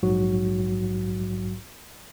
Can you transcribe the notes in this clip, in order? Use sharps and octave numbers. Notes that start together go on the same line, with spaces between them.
A#1 G#2 F#3 F#4